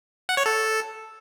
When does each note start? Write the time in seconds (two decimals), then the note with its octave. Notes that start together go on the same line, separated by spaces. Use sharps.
0.29 F#5
0.37 C#5
0.46 A4